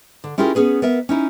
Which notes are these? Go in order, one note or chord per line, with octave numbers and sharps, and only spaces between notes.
D3
C#4 E4 F4 G4 G#4 A#4
B3 C#4 G#4 B4
B3 A#4 E5
C#4 D#4 E4